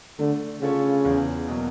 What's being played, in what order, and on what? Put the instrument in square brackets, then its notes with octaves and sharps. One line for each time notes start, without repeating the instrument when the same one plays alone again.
[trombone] D3 [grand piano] A3
[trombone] C#3 [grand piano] C#4 F4 A4 C#5
[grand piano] E2
B2 F#3 A#3